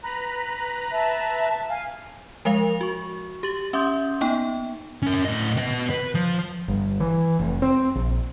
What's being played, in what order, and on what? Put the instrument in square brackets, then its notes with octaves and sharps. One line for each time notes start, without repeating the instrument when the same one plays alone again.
[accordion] B4 A#5 B5
[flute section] E5 A5
F5 G#5
[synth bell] F3 G#3 A#4 F5 F7
F#4 C#6
G4 A6 F#7
C#4 E5 C6 D6 D#6 G6
A#3 B3 D#4 G5
[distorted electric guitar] C#4 A#4
A2 D#5
B3 D#5
B4
F3
[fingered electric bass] G1
E3
F1
C4
A#1